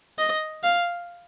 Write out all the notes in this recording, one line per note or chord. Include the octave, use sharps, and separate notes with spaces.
D#5
F5